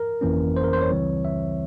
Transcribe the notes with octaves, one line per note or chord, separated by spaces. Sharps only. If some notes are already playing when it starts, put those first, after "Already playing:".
Already playing: A#4
G1 F2 E3 A#3 C#4
C5
A#4
C5
C#5
C#2 C#3 E3 G3 C4
E5